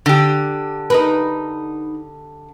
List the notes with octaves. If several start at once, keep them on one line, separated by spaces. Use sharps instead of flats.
D3 G4
D#4 A#4 B4